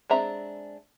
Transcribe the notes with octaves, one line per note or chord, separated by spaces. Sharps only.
G#3 C4 D4 E5 A#5